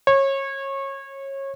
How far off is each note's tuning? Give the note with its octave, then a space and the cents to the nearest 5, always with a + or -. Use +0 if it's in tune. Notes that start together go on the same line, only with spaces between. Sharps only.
C#5 -25